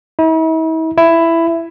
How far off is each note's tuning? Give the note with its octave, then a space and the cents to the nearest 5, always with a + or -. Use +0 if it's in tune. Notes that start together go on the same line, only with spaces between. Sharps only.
E4 -45
E4 +10